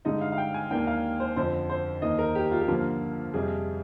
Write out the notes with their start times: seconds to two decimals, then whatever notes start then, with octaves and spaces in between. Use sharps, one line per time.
0.05 G2 D3 G#3 D#4 D#5
0.21 F5
0.32 F5
0.38 G5
0.54 G#5
0.71 D#2 D#3 A#3 D4 G5
0.87 F5
1.20 C5
1.36 F2 D3 F3 C5
1.70 C5
2.02 D#2 D#3 A#3 D#5
2.19 A#4
2.35 G4
2.51 F4
2.61 G4
2.68 G2 D3 F3 A#3 F4
3.33 F2 C3 G3 G#4